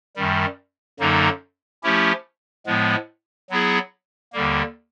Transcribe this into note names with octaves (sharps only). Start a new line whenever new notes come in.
F#2 D#3 G3
F#2 D3 F#3 A#3 D#4
F3 A3 C#4 E4 G4
A2 F3 G#3 B3
F#3 B3 E4 G#4
D#2 D3 G3 A#3